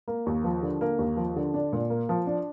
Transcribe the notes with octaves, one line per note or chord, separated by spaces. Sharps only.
A#3
D#2
F3
D3
A#3
D#2
F3
D3
D4
A#2
A#3
F3
D4